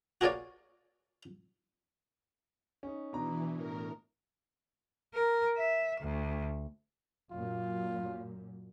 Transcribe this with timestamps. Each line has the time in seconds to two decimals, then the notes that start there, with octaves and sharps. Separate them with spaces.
0.21 F#4 G#4 A#4 C#5 D5 F5
2.83 C#4 D#4
3.13 B2 E3 D4 A#5
3.53 A2 A#4
5.14 A#4
5.57 E5
6.01 D2
7.32 F#2 A#2 F4